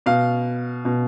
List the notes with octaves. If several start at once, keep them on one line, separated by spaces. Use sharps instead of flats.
B2 F5
B2